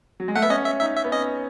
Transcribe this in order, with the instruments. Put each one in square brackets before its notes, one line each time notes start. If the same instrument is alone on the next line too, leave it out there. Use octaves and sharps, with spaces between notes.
[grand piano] F#3
G#3
[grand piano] A3 [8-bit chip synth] F#5
[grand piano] B3 [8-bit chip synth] E5
[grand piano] C#4 [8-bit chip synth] D#5
[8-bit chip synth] E5
[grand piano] D#4 [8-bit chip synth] E5
[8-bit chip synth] E5
[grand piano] B3
[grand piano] C#4 [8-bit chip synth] D#5